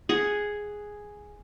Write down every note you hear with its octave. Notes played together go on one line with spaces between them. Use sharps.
G#4 F#5